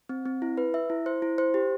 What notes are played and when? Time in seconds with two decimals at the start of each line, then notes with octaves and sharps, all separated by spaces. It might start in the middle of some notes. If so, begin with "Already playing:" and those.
0.09 C4
0.26 C4
0.42 E4
0.58 B4
0.74 E5
0.90 E4
1.06 C5
1.22 E4
1.38 C5
1.54 G4